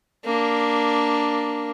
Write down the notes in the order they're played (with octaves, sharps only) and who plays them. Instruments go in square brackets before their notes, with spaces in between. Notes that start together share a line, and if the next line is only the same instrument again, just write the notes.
[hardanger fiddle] A#3 D4